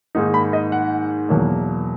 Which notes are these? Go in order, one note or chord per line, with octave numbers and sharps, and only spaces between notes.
G#2 D#3 A#3 D#4
B5
D#5
F#5
E2 B2 F#3 A#3